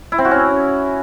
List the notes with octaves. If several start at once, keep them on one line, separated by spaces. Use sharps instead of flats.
E4
C4
F#4
C#4